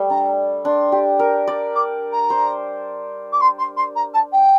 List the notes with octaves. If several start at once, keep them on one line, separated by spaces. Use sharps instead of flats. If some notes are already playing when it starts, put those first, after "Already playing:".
Already playing: G3 A3
D4 A#5
D4 C6
G4
A#4
D5
D6
A#5
C5
D6
C6
C6
C6
A#5
A5
G5